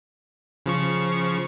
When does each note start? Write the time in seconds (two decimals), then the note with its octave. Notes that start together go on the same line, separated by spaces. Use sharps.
0.66 C#3 F3 C#6